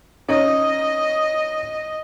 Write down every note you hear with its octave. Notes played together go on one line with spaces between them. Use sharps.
C#4 D#4 D#5